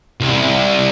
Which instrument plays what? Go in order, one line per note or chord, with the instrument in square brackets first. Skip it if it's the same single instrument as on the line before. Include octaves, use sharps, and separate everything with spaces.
[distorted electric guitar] C2